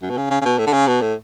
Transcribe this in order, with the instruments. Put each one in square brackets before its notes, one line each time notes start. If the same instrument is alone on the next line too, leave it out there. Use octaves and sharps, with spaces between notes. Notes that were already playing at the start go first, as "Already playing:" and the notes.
[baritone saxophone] F#2
B2
C#3
C#3
C#3
B2
A2
D3
C#3
B2
A2